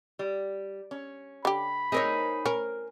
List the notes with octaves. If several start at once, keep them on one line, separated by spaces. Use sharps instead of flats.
G3
C#4
D3 G4 B5
C4 D#4 G#4 A#4 C#5
C#4 A#4